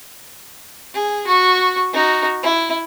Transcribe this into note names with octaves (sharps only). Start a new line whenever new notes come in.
G#4
F#4 C#6
D#4 F#4
E4